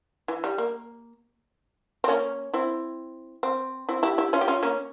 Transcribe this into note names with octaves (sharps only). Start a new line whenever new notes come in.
E3
G3
A#3
C4
A#3 C#4
C4 E4
C4
C4 E4
E4 G4
E4 G4
C#4 F4
G4
C#4 F4
A#3 C#4